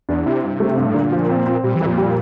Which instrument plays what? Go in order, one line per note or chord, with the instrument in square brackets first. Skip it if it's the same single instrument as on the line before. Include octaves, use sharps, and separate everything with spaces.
[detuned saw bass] E2 [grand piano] D4
[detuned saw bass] C3 [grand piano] E4
[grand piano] G2
A3
G2
[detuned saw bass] A2
[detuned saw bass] A#2 [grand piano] D3
[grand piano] F3
C4
C4
[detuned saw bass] A#2 [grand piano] G3
[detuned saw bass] E3
[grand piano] F2
[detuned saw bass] A#2
[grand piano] G3